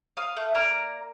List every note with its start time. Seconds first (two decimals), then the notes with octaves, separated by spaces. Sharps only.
0.17 F5 D#6
0.36 A3
0.54 A#3 D5 A#5 F6